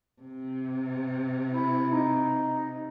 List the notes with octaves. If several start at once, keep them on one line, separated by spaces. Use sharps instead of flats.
C3
E4
D#4